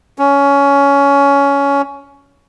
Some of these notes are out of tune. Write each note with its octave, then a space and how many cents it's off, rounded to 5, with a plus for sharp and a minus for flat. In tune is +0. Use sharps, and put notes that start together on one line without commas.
C#4 +15